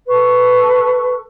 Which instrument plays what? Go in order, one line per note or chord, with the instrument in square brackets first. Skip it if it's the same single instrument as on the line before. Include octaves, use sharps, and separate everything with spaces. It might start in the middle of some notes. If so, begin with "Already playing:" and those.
[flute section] A4 B4 C#6